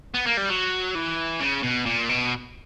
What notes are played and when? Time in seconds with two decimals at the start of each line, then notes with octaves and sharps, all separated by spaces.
0.14 B3
0.26 A#3
0.37 G3
0.49 F#3
0.95 E3
1.40 C#3
1.63 B2
1.86 A#2
2.09 B2